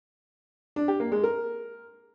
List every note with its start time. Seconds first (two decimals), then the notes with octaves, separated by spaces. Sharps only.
0.76 D4
0.88 G4
1.00 A#3
1.12 G#3
1.24 A#4